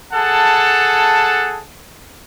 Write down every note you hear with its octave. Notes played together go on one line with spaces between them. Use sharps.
G#4 A4 F#5 A5